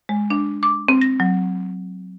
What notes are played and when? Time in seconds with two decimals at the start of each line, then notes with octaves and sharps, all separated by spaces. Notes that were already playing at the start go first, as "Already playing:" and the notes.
0.09 G#3
0.30 D4
0.63 D6
0.88 C4
1.01 A#6
1.20 F#3